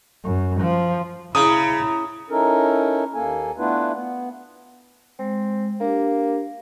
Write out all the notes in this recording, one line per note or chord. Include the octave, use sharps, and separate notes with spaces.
F#2
F3
C#3 E4 A#5 D#6
C#4 D#4 E4 A4 A#4
D#2 A#3 A4 G#5
A3 B3 D4 E4 F4 B4
B3
G#3 C4
A#3 D4 G4